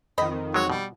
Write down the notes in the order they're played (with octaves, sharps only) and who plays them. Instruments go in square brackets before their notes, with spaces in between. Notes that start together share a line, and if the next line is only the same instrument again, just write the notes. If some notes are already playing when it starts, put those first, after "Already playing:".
[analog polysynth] F2 D#3 [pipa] C4 D#5 B5
[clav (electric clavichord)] F#3 G#3 [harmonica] F#4 C#5
[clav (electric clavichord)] B2 [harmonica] G3